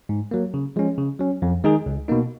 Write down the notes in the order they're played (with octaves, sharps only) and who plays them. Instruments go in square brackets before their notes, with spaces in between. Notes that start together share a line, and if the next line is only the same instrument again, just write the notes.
[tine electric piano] G#2
F#3 A#3
C#3
F3 G#3 C#4
C#3
F#3 C#4
F2
D#3 G#3 D#4 G#4
C#2
B2 A#3 D#4